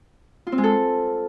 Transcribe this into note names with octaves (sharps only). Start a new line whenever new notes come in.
F4
C4
G#3
A4